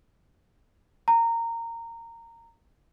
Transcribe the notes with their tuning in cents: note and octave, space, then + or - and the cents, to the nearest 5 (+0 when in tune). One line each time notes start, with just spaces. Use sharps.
A#5 -20